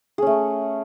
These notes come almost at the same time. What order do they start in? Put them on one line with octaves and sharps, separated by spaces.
G#4 C#4 A3